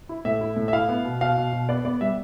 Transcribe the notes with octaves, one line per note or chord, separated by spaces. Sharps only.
E4
A2 E5
E4
A2
E5
E4 F5
B3
B2
B2 F5
B2
B2
B3 D5
B3 D5
G3 E5